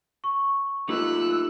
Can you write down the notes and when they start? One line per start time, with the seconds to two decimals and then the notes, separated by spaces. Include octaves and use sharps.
0.24 C#6
0.89 A3 D#4 F4 G4 E6 F#6 F#7